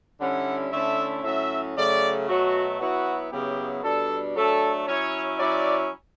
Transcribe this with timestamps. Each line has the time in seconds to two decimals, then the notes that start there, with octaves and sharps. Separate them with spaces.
0.20 D3 G3 C#4 E4 F#5
0.72 D3 A3 C#4 E4 E5
1.24 A2 F#3 C#4 E5
1.76 C#3 F#3 A3 C#4 D5
2.27 B2 F#3 A3 F#4
2.79 F#3 B3 E4 F#4
3.31 C#3 F#3 B3 E4 G4
3.83 B2 G3 D4 A4
4.35 F#3 A3 D4 A4
4.87 F#3 C#4 E4 C#5
5.39 F#3 C#4 E4 D5